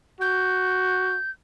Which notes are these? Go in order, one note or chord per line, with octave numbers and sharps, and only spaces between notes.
F#4 G6